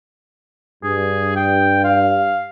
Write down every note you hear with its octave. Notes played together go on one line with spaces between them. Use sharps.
G2 G#4
G5
F5